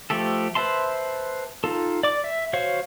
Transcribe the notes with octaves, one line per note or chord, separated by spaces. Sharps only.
F3 A3 G4 A4
B4 C5 E5 A5 C6
D#4 F4 A4
D5 D6
E5
F#4 C5 C#5 F5